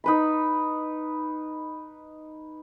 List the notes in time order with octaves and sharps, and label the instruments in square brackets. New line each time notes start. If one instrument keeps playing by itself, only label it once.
[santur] D#4 B4 B5